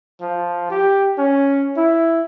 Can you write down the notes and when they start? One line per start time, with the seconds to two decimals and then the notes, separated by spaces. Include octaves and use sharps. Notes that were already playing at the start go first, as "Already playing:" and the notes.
0.21 F3
0.71 G4
1.18 C#4
1.77 E4